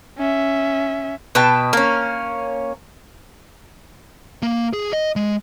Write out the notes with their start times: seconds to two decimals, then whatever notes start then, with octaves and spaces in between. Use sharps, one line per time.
0.18 C#4 E5
1.35 B2 B4 G5 A5
1.73 A#3 C#4
4.43 A#3
4.73 G#4
4.93 D#5
5.16 G#3